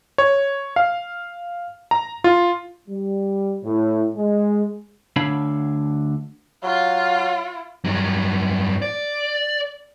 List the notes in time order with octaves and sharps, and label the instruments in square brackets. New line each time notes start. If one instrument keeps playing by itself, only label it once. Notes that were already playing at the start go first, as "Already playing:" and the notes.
[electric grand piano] C#5
F5
A#5
F4
[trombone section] G3
A2
G#3
[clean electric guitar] D2 D3 D4 C#5 F5 B5
[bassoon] F#3 [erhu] F4
[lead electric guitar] G2 F#3
D5